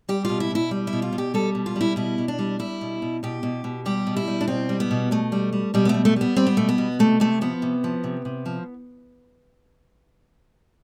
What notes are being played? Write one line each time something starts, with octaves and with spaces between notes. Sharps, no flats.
G3 G4
B2 F4
E4
B2 E4
G3
E4
B2
F4
B2
G4
G3 A4
B2
F4
G3 E4
B2 E4
B2
D4
G3
G3 E4
B2
B2
B2 G4
B2
B2
G3 G4
B2
E4
G3
D4
B2 C4
G3
B3
B2
B2 A3
G3
G3
B2 G3
B3
G3 A3
A3
G3 B3
G3 C4
B3
B2 A3
B3
B2
C3 A3
C3 A3
F3 B3
C3
F3
C3
C3
F3